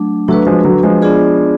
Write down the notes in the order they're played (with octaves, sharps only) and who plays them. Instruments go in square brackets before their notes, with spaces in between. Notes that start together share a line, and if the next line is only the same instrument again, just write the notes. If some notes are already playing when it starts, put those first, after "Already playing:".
Already playing: [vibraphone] F#3 A3 D4
[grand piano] F#3 A3 [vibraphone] D4 F#4 B4
[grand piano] F3 G#3
D3 F#3
F3 G#3
[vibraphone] B3 D4 F4 G#4 D5